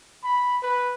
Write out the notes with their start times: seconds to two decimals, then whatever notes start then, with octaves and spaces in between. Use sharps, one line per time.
0.24 B5
0.63 B4